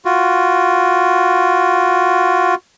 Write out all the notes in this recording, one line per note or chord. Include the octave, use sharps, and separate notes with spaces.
F4 F#4